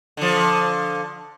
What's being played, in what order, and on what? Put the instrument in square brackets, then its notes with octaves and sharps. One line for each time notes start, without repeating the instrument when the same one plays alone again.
[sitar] D3 F3